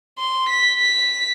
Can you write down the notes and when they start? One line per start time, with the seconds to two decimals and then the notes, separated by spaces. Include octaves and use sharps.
0.19 C6
0.49 B6
0.79 B6